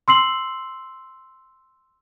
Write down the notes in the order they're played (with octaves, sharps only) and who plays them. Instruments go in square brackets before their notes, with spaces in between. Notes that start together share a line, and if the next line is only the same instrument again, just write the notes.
[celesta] C6 E6 C7 F#7